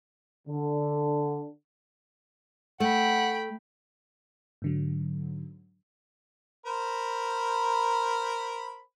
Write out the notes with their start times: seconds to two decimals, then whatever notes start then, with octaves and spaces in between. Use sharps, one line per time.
0.48 D3
2.80 A3 F#5 G5 B5
4.62 G#2 D3 F#3
6.66 A#4 C5 B5